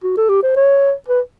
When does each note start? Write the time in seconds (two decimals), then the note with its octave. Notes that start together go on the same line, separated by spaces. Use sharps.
0.04 F#4
0.17 A4
0.29 G4
0.43 C5
0.56 C#5
1.08 B4